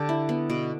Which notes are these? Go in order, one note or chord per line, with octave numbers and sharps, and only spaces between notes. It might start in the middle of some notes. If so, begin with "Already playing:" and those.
Already playing: D3 G4 A4
E4
B3
B2